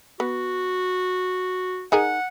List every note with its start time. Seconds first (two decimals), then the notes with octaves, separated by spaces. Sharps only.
0.20 B3 F#4
1.92 D#4 G#4 A#4 F#5